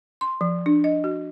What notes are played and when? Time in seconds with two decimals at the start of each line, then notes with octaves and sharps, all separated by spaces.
0.21 C6
0.41 F3
0.66 D4
0.84 D#5
1.04 F#4